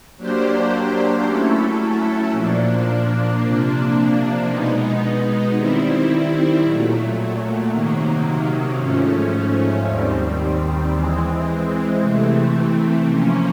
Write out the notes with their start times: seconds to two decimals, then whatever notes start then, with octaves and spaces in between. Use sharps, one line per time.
0.16 F#3 A#3 D4 G4 C5
1.24 F#3 A3 C#4 E4 A4
2.31 A#2 F3 A#3 D4
3.39 C3 F3 A#3 D4
4.47 B2 G#3 B3 D#4
5.55 D#3 G3 C4 E4
6.63 A#2 F#3 A3
7.70 C3 D#3 F#3 A#3
8.78 G#2 F3 A3 C#4
9.85 D#2 D#3 G3 C4
10.93 E3 G#3 C4
12.00 C3 E3 A3 C4
13.08 F3 A#3 C#4